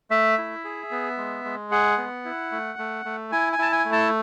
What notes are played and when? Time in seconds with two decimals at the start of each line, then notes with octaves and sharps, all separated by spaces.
0.11 A3 E5
0.38 E4
0.64 G#4
0.91 B3
1.17 G#3
1.45 G#3
1.72 G#4 F#5
1.98 B3
2.25 E4
2.52 A3
2.79 A3
3.05 A3
3.32 E4 G#5
3.53 G#5
3.59 E4 A5
3.72 G#5
3.85 A3
3.92 A5